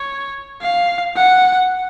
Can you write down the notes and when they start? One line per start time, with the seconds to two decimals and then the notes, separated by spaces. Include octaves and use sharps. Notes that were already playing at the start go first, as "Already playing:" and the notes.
Already playing: C#5
0.62 F5
1.16 F#5